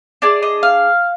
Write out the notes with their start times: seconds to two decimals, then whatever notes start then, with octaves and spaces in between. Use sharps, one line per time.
0.22 D4 G#4 D5
0.42 D#5
0.63 F5